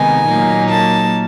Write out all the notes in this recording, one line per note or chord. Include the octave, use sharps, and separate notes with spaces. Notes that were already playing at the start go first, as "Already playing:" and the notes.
Already playing: C3 D#3 G#3 B3 D#4 G#5
A#2 F#3 A#3 D#4
A5